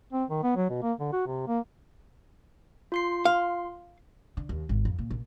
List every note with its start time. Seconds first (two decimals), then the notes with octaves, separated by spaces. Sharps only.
0.13 C4
0.30 D#3
0.44 B3
0.56 F#3
0.69 B2
0.82 A#3
1.00 D3
1.13 F#4
1.27 C3
1.47 A#3
2.92 F4 C6 C7
3.25 F5
4.37 D3
4.49 D#2
4.69 G#1
4.85 F2
4.99 A#2
5.11 A#1